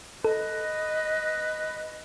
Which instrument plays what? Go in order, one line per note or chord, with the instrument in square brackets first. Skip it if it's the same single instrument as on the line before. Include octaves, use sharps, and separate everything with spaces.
[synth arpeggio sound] A4 [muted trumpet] B4 [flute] D#5